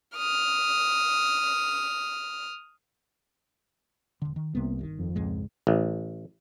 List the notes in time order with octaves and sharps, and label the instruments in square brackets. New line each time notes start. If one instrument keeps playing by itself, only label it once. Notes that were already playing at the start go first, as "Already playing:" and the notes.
[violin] D#6 F6
[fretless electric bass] E1 D3
D#3
[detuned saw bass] C2 [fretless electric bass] C3 A#3 B3
[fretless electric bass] G1 D#3
[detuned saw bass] F2
[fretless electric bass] C#2 G#2 G#3
[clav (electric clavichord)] A1